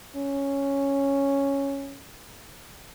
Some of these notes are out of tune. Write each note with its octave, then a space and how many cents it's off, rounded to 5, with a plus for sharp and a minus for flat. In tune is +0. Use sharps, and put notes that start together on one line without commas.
C#4 +0